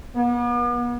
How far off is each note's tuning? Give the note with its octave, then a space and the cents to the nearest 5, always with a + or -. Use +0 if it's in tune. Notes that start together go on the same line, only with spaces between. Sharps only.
B3 -40